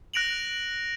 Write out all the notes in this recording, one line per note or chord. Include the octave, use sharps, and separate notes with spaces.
F#6 A#6 D7 F7 F#7